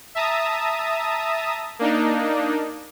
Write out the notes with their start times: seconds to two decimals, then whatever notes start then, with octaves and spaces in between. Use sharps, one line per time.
0.15 E5 A5 A#5 D#6
1.79 A#3 D4 D#4